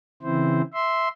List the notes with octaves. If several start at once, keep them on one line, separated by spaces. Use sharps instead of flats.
C#3 E3 C4 E4 C5
E5 C6